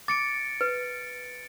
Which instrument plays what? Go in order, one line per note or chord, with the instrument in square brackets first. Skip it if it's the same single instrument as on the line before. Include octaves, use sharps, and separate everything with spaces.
[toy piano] D6 [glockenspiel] A6 C#7 D7
[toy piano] B4